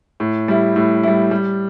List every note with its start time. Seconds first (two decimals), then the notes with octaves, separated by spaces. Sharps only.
0.20 A2
0.48 G3 E4
0.76 A2
1.03 G3 E4
1.31 G3